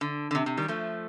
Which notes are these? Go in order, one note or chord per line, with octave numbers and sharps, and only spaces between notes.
D3
D3
C3
C3
D#3 G3
F3 A3